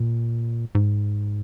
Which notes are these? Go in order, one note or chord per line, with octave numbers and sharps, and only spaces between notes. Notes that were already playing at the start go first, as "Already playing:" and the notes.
Already playing: A#2
G#2